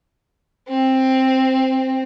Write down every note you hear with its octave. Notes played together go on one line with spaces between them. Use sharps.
C4